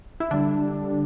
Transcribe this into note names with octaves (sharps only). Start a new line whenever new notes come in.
E4
D3 G3 D4